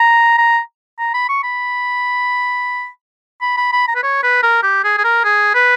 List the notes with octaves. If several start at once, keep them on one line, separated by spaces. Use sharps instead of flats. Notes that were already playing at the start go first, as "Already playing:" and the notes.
Already playing: A#5
A#5
A#5
B5
C#6
B5
B5
B5
B5
A#5
B4
C#5
B4
A#4
G4
G#4
G#4
A#4
G#4
B4